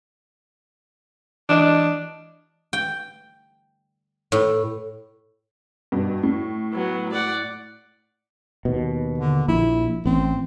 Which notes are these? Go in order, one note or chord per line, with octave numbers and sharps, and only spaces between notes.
E3 D4 D#5
G5
A2
G2 B2
A2
F#3 B3
D5 F#5
D#2 B2
D3
A#1 E4
A1 C4